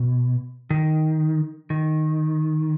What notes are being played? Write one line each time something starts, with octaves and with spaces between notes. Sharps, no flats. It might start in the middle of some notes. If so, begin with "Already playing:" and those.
Already playing: B2
D#3
D#3